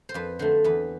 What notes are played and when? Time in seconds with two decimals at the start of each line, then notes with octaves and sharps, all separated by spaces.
0.09 C5
0.14 F2 B4
0.39 D3 F#3 A3 C5
0.64 E2 B4